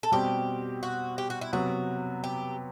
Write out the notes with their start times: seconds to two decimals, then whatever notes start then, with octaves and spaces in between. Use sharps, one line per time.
0.03 A4
0.12 B2 G3 C4 G4
0.83 F#4
1.18 G4
1.30 F#4
1.41 E4
1.53 C3 F#3 B3 F#4
2.24 G4